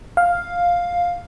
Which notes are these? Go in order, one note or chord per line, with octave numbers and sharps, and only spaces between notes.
F5